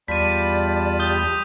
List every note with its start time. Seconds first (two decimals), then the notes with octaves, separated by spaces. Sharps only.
0.08 E2 G3 F4 D5 A5 B5 B6 D#7
0.99 G4 D#6 G6 G7